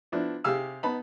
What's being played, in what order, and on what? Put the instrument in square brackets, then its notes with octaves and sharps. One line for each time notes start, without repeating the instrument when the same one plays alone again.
[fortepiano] F3 B3 D4 E4
C3 G4 G#4 F5 E6
B3 D#4 A5 B5